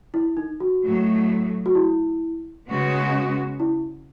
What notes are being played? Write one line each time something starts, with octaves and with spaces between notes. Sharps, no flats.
E4
D#4
F#4
A2 F#3 A3
F#4
E4
C#3 G#3 B3 F#4
E4